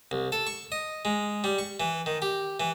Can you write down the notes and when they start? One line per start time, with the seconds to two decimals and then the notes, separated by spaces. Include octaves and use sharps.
0.11 C2
0.32 A4
0.47 C#6
0.72 D#5
1.05 G#3
1.44 G3
1.59 C#6
1.80 E3
2.06 D#3
2.22 G4
2.60 E3